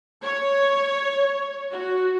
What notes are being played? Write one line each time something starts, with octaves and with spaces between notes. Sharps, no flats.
C#5
F#4